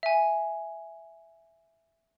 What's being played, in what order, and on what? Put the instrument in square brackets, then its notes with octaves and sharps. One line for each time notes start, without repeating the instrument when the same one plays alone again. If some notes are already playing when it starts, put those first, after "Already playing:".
[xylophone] E5 G#5